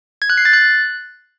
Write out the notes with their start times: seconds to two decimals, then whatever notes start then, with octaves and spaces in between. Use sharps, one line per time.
0.22 G#6
0.30 F#6
0.37 C7
0.45 A6
0.53 F#6